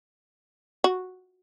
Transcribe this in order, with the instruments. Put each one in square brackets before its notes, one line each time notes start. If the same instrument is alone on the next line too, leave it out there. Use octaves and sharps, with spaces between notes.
[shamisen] F#4